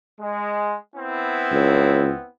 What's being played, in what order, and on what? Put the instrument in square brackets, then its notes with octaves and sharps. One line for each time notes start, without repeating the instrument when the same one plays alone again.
[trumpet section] G#3
B3 C4 E4
[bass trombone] C#2